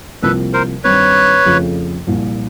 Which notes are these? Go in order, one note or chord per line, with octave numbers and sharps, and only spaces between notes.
C2 C3 F3 A#3 A4 B4
A#4 C5
G2 D#3 G3 C4 B4 C#5
F2 C#3 F3 A3
C2 A#2 F3